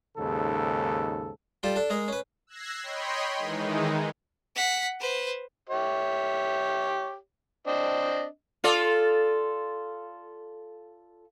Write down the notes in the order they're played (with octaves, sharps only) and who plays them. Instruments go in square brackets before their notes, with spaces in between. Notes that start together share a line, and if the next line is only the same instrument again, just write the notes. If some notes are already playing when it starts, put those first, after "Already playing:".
[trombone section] D#2 G#2 C#3 A4
[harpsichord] G3 F4 G4 A4
D4 A4
G#3 G#4 A#4
C#4 B4
[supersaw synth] E6 F#6 G#6 A#6 C7
C#5 D#5 G5 B5 C6
D#3 E3 G#3 D#4
[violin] F#5 B6
B4 C5
[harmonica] G4 C#5 E5
C4 D4 D#5
[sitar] F4 A4 D5